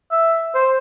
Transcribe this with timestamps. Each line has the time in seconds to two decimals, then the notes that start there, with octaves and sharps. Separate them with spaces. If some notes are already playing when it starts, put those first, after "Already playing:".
0.11 E5
0.55 C5